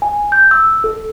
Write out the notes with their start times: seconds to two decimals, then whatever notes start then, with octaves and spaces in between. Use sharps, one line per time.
0.02 G#5
0.32 G6
0.51 E6
0.84 A4